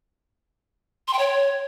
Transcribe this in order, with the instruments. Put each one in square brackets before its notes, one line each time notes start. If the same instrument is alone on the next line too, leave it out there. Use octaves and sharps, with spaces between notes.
[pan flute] C6
G5
C#5